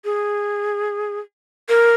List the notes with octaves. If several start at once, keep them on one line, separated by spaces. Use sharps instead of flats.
G#4
A#4